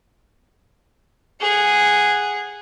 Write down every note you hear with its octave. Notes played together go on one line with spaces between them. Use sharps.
G#4 F#5